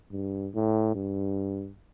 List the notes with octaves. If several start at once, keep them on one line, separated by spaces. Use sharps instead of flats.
G2
A2
G2